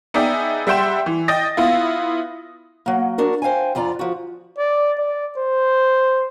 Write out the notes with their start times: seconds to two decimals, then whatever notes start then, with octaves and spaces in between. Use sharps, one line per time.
0.14 B3 D#4 G#4 D5 E5 G5
0.67 G3 E5 F#5 G5 C6 E7
1.06 E3
1.28 D#5 G5 D#6 A6 A#6
1.57 B3 E4 F4
2.86 F#3 A#3
3.18 D4 F#4 A#4
3.42 C5 F5 G5 G#5
3.75 F2 F4 D5 G#5 A#5
3.99 F3 F#4
4.58 D5
4.98 D5
5.37 C5